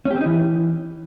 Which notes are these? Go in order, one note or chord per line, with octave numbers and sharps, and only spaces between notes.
C#4
G4
C4
D#4
E3